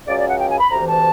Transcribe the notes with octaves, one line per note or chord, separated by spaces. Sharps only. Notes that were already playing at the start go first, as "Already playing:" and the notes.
C#2 C#3 F#3 D5
D5
F#5
G5
G#5
B5
D2 C3 E3 A#5
A5